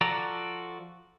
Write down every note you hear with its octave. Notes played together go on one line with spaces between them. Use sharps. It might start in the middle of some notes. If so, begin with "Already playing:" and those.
F3 F#4 A4 D5 A#5